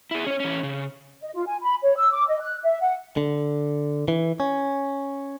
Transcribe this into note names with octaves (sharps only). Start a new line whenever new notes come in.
E4 G#4
C#4 C#5
E3 C#4
C#3
D#5
F4
G#5
B5
C#5
E6
D6
D#5
F#6
E5
F#5
D3
E3
C#4